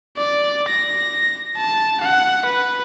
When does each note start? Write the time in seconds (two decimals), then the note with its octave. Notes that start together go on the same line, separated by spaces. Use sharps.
0.17 D5
0.69 A#6
1.57 A5
2.01 F#5
2.45 B4